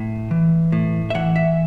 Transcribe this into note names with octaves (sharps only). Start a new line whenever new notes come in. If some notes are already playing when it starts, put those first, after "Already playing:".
Already playing: A2
E3
A2
E5
E3 F#5
E5